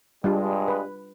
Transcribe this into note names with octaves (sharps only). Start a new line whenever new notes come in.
G2 G3 G#3 D4 F4
B4